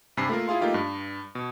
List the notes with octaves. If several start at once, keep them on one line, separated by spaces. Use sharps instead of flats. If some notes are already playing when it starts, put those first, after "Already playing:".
G2 C3 G#5 B5 C7
A3 A#3 F4 A#4
E4 F4 G#4 F5 C6
A3 A#3 D#4 F4 G4
G2
B2